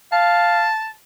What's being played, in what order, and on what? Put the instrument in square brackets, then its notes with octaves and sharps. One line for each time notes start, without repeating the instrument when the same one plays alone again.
[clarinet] F5 [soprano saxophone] A5